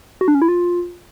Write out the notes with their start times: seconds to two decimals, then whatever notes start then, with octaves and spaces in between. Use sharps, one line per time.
0.21 F#4
0.28 D4
0.35 C#4
0.42 E4
0.48 F4